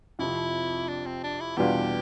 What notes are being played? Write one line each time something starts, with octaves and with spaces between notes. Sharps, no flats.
F2 C3 F3 E4
D4
C4
D4
E4
E2 B2 G3 D4 F4 G4